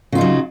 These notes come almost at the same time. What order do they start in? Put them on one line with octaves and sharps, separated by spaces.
C#3 F4 D#4 F#3